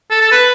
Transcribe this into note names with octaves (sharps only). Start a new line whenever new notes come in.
A4
A4
B4